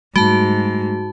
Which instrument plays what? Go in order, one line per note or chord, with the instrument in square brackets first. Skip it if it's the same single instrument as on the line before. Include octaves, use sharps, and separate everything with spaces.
[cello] G#2 [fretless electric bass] G3 A3 [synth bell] F#4 A5